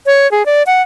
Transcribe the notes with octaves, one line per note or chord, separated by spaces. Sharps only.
C#5
G#4
D5
F#5